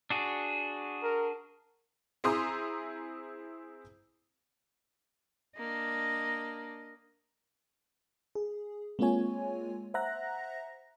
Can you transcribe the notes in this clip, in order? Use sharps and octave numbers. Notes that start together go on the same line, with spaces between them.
D4 F#4 G#4
A#4
C4 E4 G#4 A#5 C6 D#6
A#3 D4 D#5
G#4
G#3 A#3 C4 F4 C#5 G#5
C5 E5 F#5 A#5 F#6 A#6